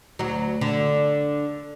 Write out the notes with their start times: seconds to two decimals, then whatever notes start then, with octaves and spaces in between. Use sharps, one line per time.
0.19 D2 F#3
0.61 D3